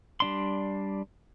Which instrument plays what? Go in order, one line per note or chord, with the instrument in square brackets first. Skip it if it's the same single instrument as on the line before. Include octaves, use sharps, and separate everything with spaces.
[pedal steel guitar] G3 D4 C6